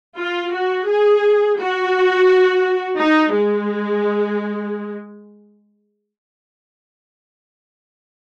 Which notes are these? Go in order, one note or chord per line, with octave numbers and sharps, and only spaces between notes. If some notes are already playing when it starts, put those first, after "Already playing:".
F4
F#4
G#4
F#4
D#4
G#3